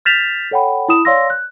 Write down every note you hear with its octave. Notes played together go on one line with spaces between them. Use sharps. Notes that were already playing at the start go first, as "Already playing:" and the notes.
F6 G6 A6 B6 E7 F7
A4 C#5 F#5 G5 B5
E4 B5 D#6 E7
C#5 D5 F5 C6 E6 A#6
F#6